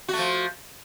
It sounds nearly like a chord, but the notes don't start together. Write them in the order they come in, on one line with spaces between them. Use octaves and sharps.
F#4 A3 F3